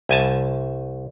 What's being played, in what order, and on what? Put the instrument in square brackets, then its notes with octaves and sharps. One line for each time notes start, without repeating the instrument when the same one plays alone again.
[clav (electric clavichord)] C2 G#5 A5